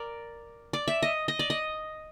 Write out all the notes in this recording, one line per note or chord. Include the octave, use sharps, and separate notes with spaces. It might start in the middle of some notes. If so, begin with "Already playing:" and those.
Already playing: A#4 D5
D5
E5
D#5
D#5
D5
D#5